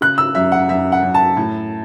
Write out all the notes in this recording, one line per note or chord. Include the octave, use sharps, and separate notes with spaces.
C#3 F#6
E6
F#2 E5
F#5
F#2 E5
F#5
F#2
A5
A2